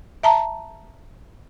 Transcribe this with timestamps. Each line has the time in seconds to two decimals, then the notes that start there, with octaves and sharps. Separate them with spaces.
0.23 E5 A5 A#5